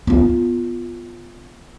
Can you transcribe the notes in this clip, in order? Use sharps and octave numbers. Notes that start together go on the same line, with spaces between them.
B3 F4